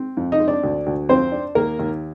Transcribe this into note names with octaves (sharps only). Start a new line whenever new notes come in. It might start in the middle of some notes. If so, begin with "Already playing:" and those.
Already playing: C4
F2
D#4 D#5
C4
D4 D5
D2
D2
F2 C4 C5
D4
D#2 A#3 A#4
D#2